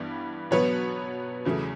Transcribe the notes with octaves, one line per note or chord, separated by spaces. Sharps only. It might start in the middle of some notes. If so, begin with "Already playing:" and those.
Already playing: G2 E3 G3 B3
B2 F#3 B3 B4 C#5
E2 C#3 F#3 A3